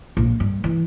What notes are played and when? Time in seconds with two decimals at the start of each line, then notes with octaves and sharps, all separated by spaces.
0.17 A#1
0.40 G2
0.64 E3